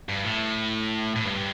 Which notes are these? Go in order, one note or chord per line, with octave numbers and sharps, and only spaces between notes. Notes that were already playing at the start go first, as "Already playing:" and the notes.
G2
A2
A2
G2